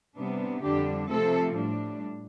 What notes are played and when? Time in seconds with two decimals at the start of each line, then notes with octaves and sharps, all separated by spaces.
0.17 C3 G3 B3 D4
0.63 F2 D3 G3 D4 G4
1.10 C3 F3 A3 C4 A4
1.55 A2 G3 D4